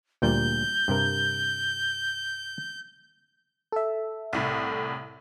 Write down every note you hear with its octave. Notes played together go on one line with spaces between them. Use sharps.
D2 A#2 G3 G6
G2 C3 A#4
A4 E5
C2 A2